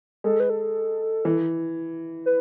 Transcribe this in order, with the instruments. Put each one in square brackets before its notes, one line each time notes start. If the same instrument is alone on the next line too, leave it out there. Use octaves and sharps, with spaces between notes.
[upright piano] G#3 [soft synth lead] A4
[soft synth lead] B4
A4
[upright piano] E3
[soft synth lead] B4